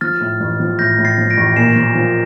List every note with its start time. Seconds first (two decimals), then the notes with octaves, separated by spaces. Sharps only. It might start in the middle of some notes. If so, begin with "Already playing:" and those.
0.01 F3 F6 A6
0.21 A2
0.40 A1
0.60 F3
0.79 A2 G6 A#6
0.98 A2
1.05 A6 C7
1.18 F3
1.30 A#6 D7
1.37 A1
1.56 A#2 C7 E7
1.76 F3
1.95 F3